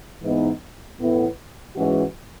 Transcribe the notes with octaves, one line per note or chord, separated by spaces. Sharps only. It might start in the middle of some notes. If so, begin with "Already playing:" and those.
G#2 E3 B3 D#4
A2 E3 B3
G#2 E3 G#3 C#4 F#4